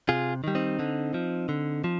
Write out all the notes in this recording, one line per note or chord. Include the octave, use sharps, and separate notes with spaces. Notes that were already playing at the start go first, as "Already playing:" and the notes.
C3 F4 G#4
D#3 G3
C4 D#4
D3
F3
D3
F3